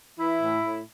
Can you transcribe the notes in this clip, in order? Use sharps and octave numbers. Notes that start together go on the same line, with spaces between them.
E3 E4
A2
A2